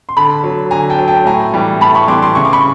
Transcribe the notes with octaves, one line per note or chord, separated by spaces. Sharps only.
C6
D3 A5 B5
F#3
D3 G#5 A#5
G5 A5
F#3
G5 A5
A2 G#5 A#5
E3 G3
A2 A5 B5
B5 C#6
E3 G3 C6 D6
C6 D6
C#3 C#6
D6
B5 C#6